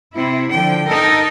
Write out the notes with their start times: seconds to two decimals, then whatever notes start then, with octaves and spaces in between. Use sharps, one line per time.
0.16 C3 E4
0.51 D3 F3 G5
0.90 D#4 A4 A#4 D#5 G5